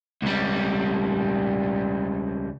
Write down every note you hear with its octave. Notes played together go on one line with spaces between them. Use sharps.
C#2 G3